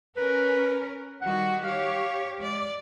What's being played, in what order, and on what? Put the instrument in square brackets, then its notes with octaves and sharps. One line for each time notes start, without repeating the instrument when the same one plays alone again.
[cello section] C#4 A#4 [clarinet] B4
[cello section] D#3 G3 F#4 [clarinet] F#5
[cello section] G4 C#5 [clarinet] F5
[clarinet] G#3 [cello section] D5